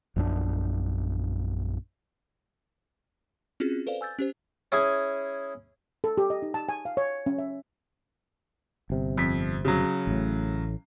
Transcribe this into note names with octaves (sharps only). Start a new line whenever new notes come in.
A#1 F#2 D#3 D4
C4 C#4 F4 F#4 G#4
A4 B4 C5 D5 F5
G#5 E6 G6 A6
C#4 G4 C5
C#4 E4 G#4 G#5
A4
G4
D#5
D#4
A5
G#5
F5
C#5
C#4
E5
G1 C3
F2 B6
C#3 F#3
A1 A2